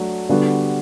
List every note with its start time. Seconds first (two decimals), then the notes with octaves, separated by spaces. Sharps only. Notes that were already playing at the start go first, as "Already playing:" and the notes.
Already playing: F#3 A3 D4 F#4
0.29 D3 G3 B3 F#4 A4